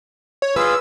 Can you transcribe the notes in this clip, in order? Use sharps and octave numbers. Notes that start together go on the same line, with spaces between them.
C#5
F4 G#4 B4 E6